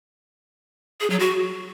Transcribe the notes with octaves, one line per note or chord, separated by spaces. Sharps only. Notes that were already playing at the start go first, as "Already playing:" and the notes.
G#4
F#3
F#4